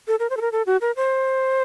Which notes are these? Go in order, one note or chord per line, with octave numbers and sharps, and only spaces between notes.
A4
A#4
C5
A4
A#4
A4
F#4
A#4
C5